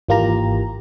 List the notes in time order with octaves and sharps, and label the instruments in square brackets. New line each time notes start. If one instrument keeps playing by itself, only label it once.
[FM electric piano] G#1 E3 A#3 F4 G4 A#5